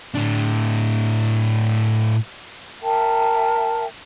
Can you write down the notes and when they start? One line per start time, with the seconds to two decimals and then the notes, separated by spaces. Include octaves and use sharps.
0.14 A2 D4
2.82 A#4 E5 G5 A5